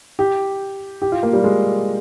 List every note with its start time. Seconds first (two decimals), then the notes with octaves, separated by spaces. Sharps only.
0.19 G4
1.02 G4
1.12 F4
1.23 A#3
1.33 G3
1.44 G#3